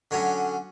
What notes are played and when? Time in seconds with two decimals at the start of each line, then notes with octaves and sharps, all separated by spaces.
0.11 D3 F#3 C#4 C#5